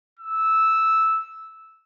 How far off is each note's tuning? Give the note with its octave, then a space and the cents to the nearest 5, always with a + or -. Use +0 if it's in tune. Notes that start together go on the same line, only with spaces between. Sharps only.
E6 -10